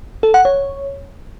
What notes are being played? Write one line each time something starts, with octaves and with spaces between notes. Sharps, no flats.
A4
F#5
C#5